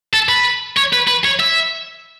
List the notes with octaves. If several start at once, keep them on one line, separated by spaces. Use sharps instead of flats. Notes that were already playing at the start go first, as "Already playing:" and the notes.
A4
B4
C#5
B4
B4
C#5
E5